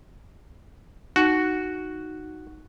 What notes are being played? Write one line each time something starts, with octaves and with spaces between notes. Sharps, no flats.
D#4 F#4